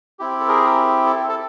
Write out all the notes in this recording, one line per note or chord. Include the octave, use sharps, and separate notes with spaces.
C4 E4 G4
A4
G#4 A#4
A4
A4